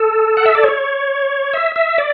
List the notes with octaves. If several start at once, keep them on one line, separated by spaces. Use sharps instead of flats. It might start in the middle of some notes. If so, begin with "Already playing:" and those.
Already playing: A4
F#5
E5
D5
C#5
E5
E5
D5